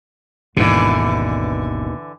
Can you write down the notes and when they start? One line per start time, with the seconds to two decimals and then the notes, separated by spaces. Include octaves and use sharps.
0.57 G#1 D#2 B2 D3 E3